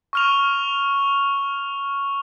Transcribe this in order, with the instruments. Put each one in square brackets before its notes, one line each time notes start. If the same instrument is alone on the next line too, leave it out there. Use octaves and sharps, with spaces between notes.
[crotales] C#6 F6 F7